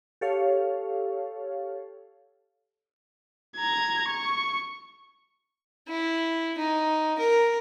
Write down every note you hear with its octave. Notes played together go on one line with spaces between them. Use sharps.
G4 A4 C#5 F5
A#5 G#6
C#6
E4
D#4
A#4